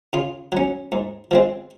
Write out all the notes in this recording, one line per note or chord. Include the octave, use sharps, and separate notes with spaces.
C#3 F4
F#3 C#4
G#2
F3 G#3 C4